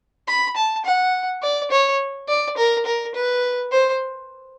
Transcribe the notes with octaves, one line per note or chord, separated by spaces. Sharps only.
B5
A5
F#5
D5
C#5
D5
A#4
A#4
B4
C5